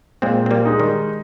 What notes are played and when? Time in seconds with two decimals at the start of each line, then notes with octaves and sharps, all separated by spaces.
0.22 A#2 G#3 C4
0.46 C4
0.51 G3 A#3
0.65 G#3 D#4
0.80 D#3 G3